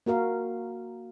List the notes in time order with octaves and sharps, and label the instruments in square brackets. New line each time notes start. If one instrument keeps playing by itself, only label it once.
[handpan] A#3 F#4 A#4 F5